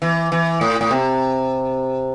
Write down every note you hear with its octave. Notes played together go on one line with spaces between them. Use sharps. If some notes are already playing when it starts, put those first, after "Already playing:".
E3
E3
A2
A2
C3